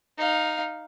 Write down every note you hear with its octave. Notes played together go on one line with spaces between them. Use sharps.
D#4 F5